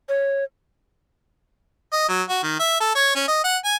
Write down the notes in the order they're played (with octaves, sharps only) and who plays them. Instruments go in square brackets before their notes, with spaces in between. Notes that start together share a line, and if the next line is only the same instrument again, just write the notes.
[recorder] C#5
[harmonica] D#5
F#3
F#4
D#3
E5
A4
C#5
C#4
D#5
F#5
G#5